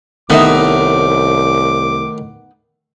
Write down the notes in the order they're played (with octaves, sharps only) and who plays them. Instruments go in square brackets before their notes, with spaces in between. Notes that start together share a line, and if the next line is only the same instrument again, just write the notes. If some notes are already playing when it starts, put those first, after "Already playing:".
[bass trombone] C2 [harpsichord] A2 D#3 [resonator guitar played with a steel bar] B3 D#4 E5 [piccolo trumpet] D6